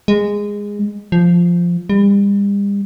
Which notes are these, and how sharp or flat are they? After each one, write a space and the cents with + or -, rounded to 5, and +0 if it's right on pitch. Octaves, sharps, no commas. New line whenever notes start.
G#3 -15
F3 -5
G3 +40